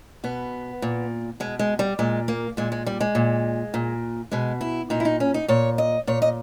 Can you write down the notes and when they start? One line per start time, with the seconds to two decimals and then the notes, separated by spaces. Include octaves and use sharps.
0.24 B2 B3
0.82 A#2
1.40 B2 G#3
1.59 G#3
1.79 G3
1.99 A#2 G#3
2.28 A#3
2.57 A#2 G#3
2.72 G#3
2.86 G3
3.01 G#3
3.15 A#2
3.74 A#2
4.32 B2 G#3
4.61 E4
4.90 A#2 D#4
5.00 E4
5.05 D#4
5.20 C#4
5.34 D#4
5.48 A#2 C#5
5.78 D#5
6.07 A#2 C#5
6.22 D#5